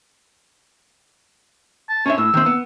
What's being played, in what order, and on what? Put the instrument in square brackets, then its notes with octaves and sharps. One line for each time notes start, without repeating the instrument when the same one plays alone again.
[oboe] A5
[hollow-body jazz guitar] C#4 D4 E5 [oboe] C#5
[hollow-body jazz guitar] A2 [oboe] E6
[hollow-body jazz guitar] D#3 C4
B3